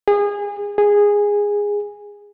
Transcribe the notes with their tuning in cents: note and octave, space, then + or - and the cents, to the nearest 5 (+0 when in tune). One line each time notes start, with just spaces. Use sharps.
G#4 -30
G#4 -15